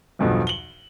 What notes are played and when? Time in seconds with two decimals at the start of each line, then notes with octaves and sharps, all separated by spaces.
0.19 B1 E2 G2 B2 D3 F3
0.47 F#7 G7